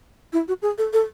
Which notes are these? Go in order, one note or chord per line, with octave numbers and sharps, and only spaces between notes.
E4
F#4
G#4
A4
A4